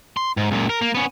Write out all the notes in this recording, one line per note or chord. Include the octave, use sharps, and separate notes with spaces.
C6
G#2
C#2 A#2
A#4
A#3
B3 C#4